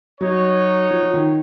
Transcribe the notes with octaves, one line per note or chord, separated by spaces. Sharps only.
F#3 D#4 F#4 C#5
F3
F3
D#3